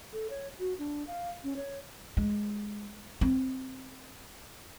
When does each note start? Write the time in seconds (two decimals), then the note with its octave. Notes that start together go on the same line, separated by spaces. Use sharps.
0.13 A4
0.30 C#5
0.60 F#4
0.79 D4
1.07 F5
1.44 C#4
1.56 C#5
2.17 G#3
3.21 C4